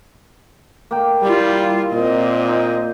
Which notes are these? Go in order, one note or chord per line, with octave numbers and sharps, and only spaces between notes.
A#3 G5
G3 E4 F4
A#2 C4 D#5
D#4